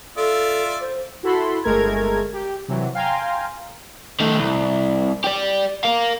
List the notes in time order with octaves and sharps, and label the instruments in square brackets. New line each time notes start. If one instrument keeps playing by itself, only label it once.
[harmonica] F4 D5 E5 [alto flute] A4
[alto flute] C5
[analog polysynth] E4 F#4 A4 B5 C6
G1 G#3 A3 A#4 A#5 G#6
G4
C3 E3 F#3
F5 G5 G#5 A#5 C6
[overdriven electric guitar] D#3 A3
C2
G4 D5
A#4 F5